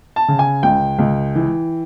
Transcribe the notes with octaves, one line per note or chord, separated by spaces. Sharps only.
A5
C#3
G#5
C#2 G5
C#2
E3